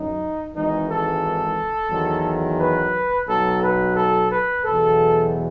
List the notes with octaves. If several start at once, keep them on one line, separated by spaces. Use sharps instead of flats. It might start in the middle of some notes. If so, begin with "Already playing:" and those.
Already playing: F#2 D#3 F#3 D#4
G#1 G#2 E3 D#4
A4
E2 D#3 F#3
B4
B1 B2 F#3 A4
B4
A4
B4
E2 B2 F#3 A4